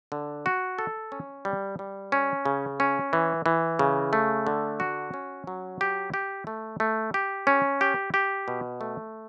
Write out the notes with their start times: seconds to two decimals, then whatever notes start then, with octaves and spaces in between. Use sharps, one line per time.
0.12 D3
0.46 F#4
0.79 A4
1.12 C#4
1.45 G3
1.79 G3
2.12 C#4
2.45 C#3
2.80 C#4
3.13 E3
3.46 E3
3.79 C#3
4.13 A3
4.47 D3
4.80 F#4
5.14 C#4
5.47 F#3
5.81 G4
6.14 G4
6.47 A3
6.80 A3
7.14 G4
7.47 C#4
7.81 G4
8.14 G4
8.48 B2
8.81 A3